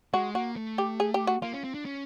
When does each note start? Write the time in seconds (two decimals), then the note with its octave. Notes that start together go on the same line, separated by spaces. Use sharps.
0.13 G#3 F#4
0.35 A#3 F#4
0.56 A3
0.78 G4
1.00 G#4
1.14 G4
1.27 F#4
1.42 A#3 F4
1.53 C#4
1.64 C4
1.74 D4
1.85 C#4